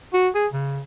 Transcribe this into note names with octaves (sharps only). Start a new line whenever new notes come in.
F#4
G#4
C#3